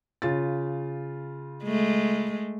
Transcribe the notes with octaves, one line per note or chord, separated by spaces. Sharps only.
C#3 F4 A6
G#3 A3